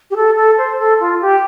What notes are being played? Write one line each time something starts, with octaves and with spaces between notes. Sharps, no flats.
G4
A4
A4
C5
A4
F4
G4